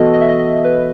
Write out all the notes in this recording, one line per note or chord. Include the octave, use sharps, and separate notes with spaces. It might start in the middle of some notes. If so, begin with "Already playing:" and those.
Already playing: E3 B3 F#4 A4 D#5
D#5
E5
D#5
D#5
B4